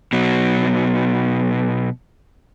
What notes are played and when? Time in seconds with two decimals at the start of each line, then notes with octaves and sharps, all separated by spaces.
0.13 B2 F#3